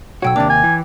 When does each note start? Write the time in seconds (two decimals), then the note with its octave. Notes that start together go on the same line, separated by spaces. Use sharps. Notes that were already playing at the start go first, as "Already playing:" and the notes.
0.22 B1 F#4 C#5 G5 E6
0.36 D#2 C3 A#3 D4 D6 A6
0.50 G#5
0.64 E3